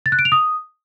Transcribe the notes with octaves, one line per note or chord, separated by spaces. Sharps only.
A6
F#6
D7
F7
D#6